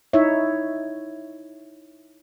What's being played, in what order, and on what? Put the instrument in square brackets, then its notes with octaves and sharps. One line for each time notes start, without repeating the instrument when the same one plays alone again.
[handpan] D#4 E4 C#5 E5